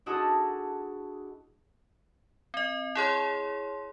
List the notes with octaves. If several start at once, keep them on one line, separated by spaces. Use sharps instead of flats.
D4 E4 F#4 G#4 A4 D#5
C4 D#5
E4 G#4 C#5 C6